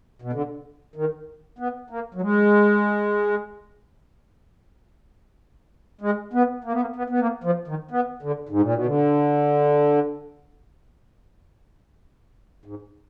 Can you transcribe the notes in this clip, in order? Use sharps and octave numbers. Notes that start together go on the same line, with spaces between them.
B2
D3
D#3
B3
A#3
F#3
G#3
G#3
B3
A#3
B3
A#3
B3
B3
A#3
F3
D#3
B3
D3
G#2
A#2
B2
D3
G#2